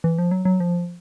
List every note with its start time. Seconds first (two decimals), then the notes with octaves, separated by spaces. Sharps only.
0.04 E3
0.18 F3
0.31 F#3
0.45 F#3
0.60 F3